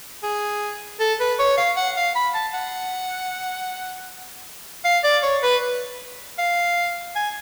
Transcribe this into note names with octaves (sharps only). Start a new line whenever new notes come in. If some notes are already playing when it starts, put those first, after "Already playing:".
G#4
A4
B4
C#5
F5
F#5
F5
B5
A5
F#5
F5
D5
C#5
B4
F5
G#5